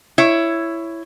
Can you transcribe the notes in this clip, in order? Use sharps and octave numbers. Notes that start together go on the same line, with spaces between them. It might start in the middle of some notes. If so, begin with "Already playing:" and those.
E4 C#5